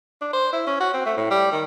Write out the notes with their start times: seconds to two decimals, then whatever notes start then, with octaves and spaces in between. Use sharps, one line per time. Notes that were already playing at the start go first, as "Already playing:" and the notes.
0.22 D4
0.33 C5
0.53 E4
0.67 C#4
0.80 F#4
0.94 C4
1.06 A3
1.17 A2
1.31 G3
1.52 D#3